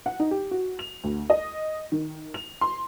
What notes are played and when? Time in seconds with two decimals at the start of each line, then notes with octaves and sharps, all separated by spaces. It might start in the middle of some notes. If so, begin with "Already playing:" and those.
0.06 F#5
0.20 D#4
0.31 G4
0.51 F#4
0.79 F7
1.04 D2
1.30 D#5
1.92 D#3
2.34 F7
2.61 C6